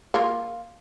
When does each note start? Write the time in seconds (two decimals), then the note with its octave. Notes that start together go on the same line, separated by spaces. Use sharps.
0.14 A#3 F4